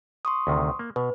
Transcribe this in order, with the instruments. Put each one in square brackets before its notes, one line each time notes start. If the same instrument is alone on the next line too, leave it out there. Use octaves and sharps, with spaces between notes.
[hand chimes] C6 C#6 D#6
[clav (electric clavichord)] D2 C3 D#3
A#3
[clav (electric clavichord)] B2 [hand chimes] B4